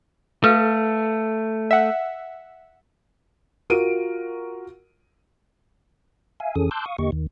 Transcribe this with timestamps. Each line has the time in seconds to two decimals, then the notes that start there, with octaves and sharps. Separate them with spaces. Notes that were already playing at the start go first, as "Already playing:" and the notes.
0.44 A3 A4 B4 F5
1.71 E5 F#5
3.70 F4 F#4 A#4 D7 D#7
6.40 E5 F5 G#5
6.56 F2 E3 C#4 G#4 A4 D#6
6.71 A5 C6 D6 E6 F#6 G6
6.86 F5 C#6 D#6
6.99 E2 D3 A#3 G4 D#5 C#6
7.12 D#2 D#3